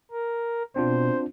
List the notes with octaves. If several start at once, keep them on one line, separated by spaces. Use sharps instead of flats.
A#4
B2 C4 D4 F4 C5